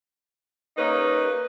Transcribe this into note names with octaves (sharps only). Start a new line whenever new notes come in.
A#3 C#4 D#4 B4